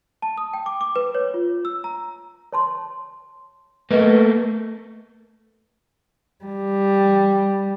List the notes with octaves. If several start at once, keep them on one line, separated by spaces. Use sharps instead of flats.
A5
D#6
G5
D6
D6
B4
C#5
F4
E6
A#5
C#5 A5 C6
A3 A#3 B4 D#5 F#5
G3